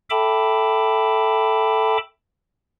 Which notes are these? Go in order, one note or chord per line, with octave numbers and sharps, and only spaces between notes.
A4 E5 G5 A5 B5 D6